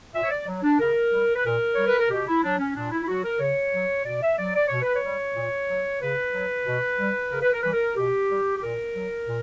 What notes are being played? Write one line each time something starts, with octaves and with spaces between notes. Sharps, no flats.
A#2 E5
C#5
D5
F#3
D4
C#3 A#4
G3
B4
A#2 A#4
G3 C#5
B4
A#4
B2 G4
E4
F#3 D4
C#4
A#2 D4
E4
E4
F#3 F#4
A#4
C#3 C#5
F#3
B2 D5
E5
F#3 D5
D5
B2 C#5
B4
C#5
G3
A#2
F#3
C#3 B4
F#3
B2
G3
C#3 A#4
B4
A#4
E3 G3 B4
A#4
B2 G4
G3
G4
A#2 A#4
F#3
A#2